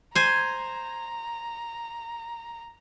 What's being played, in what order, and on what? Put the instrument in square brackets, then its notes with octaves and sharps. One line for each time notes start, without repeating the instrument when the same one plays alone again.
[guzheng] C5 G#5 [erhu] A#5